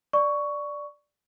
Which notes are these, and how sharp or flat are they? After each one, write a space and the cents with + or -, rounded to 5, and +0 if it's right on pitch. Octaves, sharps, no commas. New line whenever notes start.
D5 +0 C#6 +10